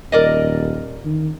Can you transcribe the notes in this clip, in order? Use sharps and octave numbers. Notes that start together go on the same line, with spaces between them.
D#1 A#4 D5 D#5
D#3